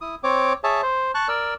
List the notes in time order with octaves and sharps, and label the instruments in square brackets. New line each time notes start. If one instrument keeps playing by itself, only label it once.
[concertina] E4 D#6
C4 C#5 D6
G#4 C#5 E5 A5
C5
A5 C#6 F#6
A#4 D5 E6